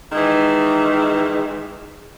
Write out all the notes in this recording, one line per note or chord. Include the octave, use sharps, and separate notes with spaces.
D#3 E3 G#3